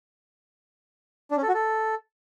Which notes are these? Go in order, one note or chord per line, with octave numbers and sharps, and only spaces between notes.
D4
C#4
A4
F#4
A4